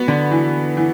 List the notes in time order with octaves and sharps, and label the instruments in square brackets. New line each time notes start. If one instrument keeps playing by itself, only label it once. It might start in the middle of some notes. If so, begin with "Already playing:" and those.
Already playing: [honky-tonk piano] B3 F#4
[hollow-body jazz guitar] D3
[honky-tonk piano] E3
E3